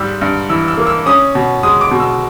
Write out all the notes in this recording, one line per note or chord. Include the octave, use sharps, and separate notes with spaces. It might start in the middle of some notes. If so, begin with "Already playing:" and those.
Already playing: G#2 G3 E6
G2
E3 E6
E6
A#3
E6
C#4 D#6
B2
G#3 D#6
D6
B2
E6